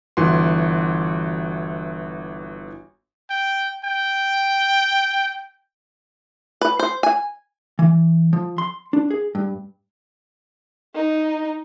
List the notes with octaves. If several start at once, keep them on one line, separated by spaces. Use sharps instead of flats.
G1 E3 F#4 C6
G5
G5
B4
C5
G#5
E3
F3
C6
D4
G#4
G2
D#4